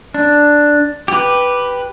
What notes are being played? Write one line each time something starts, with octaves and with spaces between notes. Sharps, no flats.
D4
G4 B4